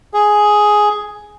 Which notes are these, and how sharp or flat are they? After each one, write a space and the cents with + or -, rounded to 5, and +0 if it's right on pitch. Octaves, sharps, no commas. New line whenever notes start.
G#4 +5